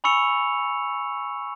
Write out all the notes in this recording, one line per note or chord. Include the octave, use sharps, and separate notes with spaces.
G#5 B5 C#6 E6 C#7 F7